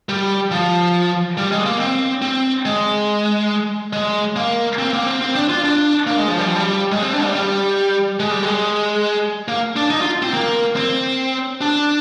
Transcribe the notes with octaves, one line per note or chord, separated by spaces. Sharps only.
G3
F3
G3
G#3
A#3
C4
C4
G#3
G#3
A#3
C4
A#3
C4
C4
D4
F4
D4
A#3
G#3
F3
G3
F3
G3
G#3
C4
D4
G3
G3
G#3
G3
G#3
A#3
D4
D#4
F4
C4
A#3
C4
D4